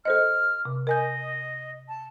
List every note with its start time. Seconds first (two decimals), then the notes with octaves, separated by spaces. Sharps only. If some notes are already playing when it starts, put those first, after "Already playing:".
0.05 A4 C5 D#5 F6
0.65 C3
0.87 A#4 D#5 G#5 G6
1.88 A5